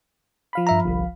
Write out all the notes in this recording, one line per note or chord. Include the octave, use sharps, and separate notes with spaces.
F3 F5 B5
G2 E5 A#5
G1 C2